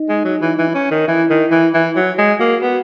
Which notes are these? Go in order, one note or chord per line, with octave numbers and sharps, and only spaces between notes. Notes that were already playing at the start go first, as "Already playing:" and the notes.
Already playing: D#4
G#3
F#3
E3
E3
C#4
D#3
E3 E4
D#3
E3
E3
F#3
G#3
A#3 F#4
B3